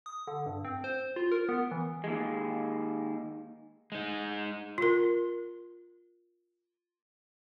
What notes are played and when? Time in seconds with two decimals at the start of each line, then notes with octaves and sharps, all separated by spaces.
0.06 D#6
0.27 D3
0.46 G2
0.65 C4
0.84 C5
1.16 F4
1.32 A#4
1.49 B3
1.71 E3
2.04 D#2 G#3
3.92 G#3 D#4
4.78 F4 A#4